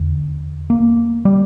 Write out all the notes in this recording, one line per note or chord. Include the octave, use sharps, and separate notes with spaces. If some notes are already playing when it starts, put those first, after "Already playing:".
Already playing: E2 D3
A#3
G3